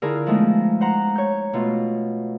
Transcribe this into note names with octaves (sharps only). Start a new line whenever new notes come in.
D3 E4 F4 G#4 A#4
F3 G#3 A3 B3 D#4
C5 F#5 A#5
C#5 G6
B2 A3 F4